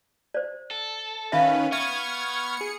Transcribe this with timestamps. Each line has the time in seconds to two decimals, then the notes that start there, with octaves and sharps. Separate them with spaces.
0.34 C5 D5
0.71 A4
1.32 D#3 C#4 B4 E5 F5 B5
1.72 B3 E5 C#6 F6 G#6
2.57 G#4 C#7